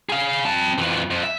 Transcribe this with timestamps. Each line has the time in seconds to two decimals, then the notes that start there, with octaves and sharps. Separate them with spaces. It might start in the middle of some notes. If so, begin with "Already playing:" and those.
0.09 G#4 F5
0.45 C4 A5
0.78 F2 E3
1.10 F2
1.23 E5